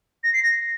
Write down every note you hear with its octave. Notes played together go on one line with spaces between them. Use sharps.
A#6
C7
A#6